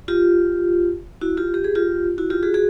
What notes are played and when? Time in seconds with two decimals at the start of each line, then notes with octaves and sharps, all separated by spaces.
0.08 F4 G4
1.21 E4 F#4
1.37 F4 G4
1.54 G4
1.64 G#4
1.75 F4 G4
2.18 E4 F#4
2.30 F4 G4
2.43 F#4 G#4
2.54 F#4 G#4